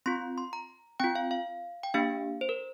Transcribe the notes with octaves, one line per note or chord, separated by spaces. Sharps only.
C4 F4 C6
C6
A#5
C4 F4 G5
F5
F5
G5
A#3 D4 G4 F5
C5
A#4